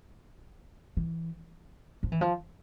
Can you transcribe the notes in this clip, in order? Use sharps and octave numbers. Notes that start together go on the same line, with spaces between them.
E3
F3
E3
F3